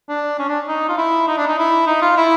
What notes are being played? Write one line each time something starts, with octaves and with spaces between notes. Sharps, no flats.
D4
C#4
D4
D#4
F4
E4
D#4
D4
D#4
E4
D#4
F4
E4